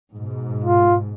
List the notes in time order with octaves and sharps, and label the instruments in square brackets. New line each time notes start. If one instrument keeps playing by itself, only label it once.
[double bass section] G#2 B2
[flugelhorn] F4